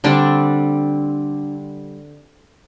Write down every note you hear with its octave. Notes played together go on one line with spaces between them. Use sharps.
D3 G3 C4 D4